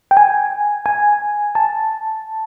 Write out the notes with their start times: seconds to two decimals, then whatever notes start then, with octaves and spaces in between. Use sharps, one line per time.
0.11 G5
0.17 G#5
0.86 G#5
1.55 A5